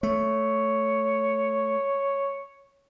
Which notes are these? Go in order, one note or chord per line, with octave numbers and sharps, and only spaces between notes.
A3 C#5